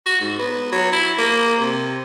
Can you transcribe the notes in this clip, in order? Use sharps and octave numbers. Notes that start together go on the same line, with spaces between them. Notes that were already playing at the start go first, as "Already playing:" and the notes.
F#4
G#2
B3
F#3
E4
A#3
C3